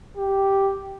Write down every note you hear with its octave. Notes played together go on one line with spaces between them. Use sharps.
G4